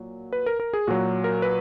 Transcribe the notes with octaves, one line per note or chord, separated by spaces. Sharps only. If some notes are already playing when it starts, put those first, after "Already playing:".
Already playing: A#2 F#3
B4
A#4
A#4
G#4
A#2 F#3 F#4
A#4
B4